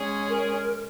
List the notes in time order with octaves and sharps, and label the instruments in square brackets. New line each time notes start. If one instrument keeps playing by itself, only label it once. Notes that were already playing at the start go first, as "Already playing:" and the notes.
Already playing: [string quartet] G#3 C#4 G#4
[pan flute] A#4